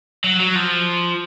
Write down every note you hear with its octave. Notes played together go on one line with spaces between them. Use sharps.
F#3
F#3
F3